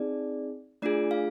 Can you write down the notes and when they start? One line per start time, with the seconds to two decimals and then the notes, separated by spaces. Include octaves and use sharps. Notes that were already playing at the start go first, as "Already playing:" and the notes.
Already playing: C4 D#4 G#4 D5
0.82 A3 D4 F4 G#4 D5
1.11 F5